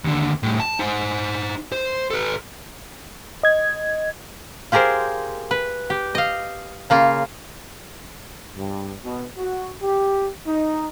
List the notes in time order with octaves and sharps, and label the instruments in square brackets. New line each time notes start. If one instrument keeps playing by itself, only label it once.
[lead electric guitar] D#2 D3
A2 G3
A5
D#4 C5
C5
A4 B4
[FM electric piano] D#5 G#6
[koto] F4 G4 G#4 A#4 C5
B4
G4
D#5 F5
C#3 A#3 F4
[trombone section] G2
B2
F#4
G4
D#4